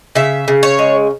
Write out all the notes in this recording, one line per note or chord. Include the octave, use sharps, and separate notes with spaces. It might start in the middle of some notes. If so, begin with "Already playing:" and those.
C#3 E5
C#3
C#5
G#3